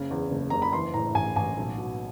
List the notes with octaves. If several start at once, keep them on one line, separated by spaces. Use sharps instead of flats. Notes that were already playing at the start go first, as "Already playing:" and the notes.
Already playing: F#1 C#3
E2
F#1
F#1 A#5
B5
E3 C6
A2 A#5
A1 G#5
A1 G#5
B1
B2